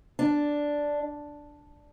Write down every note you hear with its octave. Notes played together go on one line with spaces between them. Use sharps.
D4